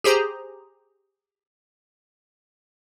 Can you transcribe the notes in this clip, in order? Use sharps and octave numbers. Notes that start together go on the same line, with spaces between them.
G4 G#4 C5 A#5